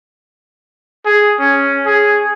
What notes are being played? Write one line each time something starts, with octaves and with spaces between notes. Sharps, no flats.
G#4
C#4
G#4